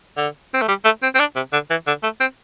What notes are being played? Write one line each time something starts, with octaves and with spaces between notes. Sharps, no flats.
D3
C4
A3
G3
A3
C4
C4
D4
C3
D3
E3
D3
A3
C4